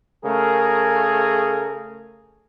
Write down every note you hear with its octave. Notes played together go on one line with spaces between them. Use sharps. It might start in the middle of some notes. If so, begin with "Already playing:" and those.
C#3 A3 G#4 A#4